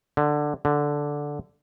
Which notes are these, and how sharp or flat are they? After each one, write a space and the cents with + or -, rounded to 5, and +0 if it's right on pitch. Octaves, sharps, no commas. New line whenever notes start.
D3 +10
D3 -5